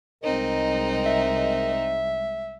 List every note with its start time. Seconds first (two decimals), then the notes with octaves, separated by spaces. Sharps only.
0.23 C2 G#3 C4 D#4 A#4 D#5
1.06 E5